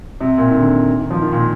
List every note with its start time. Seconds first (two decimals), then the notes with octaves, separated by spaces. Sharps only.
0.21 C3
0.38 A#2
0.50 D#3
0.55 D3
1.00 D#3
1.11 F3
1.22 D#3
1.33 A#2